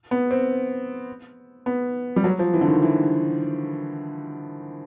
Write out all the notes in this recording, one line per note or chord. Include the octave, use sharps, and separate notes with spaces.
B3
C4
B3
G3
F#3
F3
E3
D3
D#3
E3